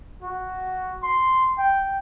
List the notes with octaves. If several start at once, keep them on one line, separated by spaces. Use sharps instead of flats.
F#4
C6
G5